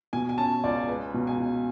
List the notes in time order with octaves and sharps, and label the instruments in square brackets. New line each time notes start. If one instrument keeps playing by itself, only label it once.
[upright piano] B2 G#5
G#5
C#4 A5
C#2 D5
G#3 B4
B2
G#5
B2